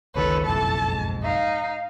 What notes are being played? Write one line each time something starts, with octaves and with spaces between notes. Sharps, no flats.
F#1 C#2 D#3 A4 B4 C#5
F#1 B1 F2 E3 A4 A5
G#2
D#4 F5